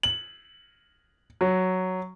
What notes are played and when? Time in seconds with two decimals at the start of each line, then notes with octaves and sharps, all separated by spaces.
0.03 F#7
1.41 F#3